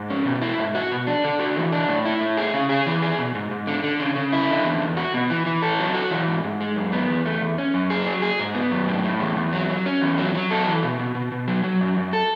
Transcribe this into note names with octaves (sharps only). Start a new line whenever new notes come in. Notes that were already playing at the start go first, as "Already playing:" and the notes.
Already playing: G#2
C#4
B2
E4
G#2
F#4
B2
D4
D3
F#4
E3
D4
A2
E4
A2
G#4
C#3
G#4
E3
G#4
B2
G#2
G#2
D3
D3
C#3
C#3
E4
D3
E2
E2
F#4
B2
E3
E3
A4
F#3
F#4
E3
G#2
G#2
G#3
F#2
B3
E2
A3
E2
C#4
F#2
G#4
F#3
G#4
G#2
B3
F#2
A2
A2
E2
E2
F#3
F#3
C#4
E2
F#3
F#3
A4
E3
B2
B2
B2
B2
F#3
F#3
F#2
F#2
A4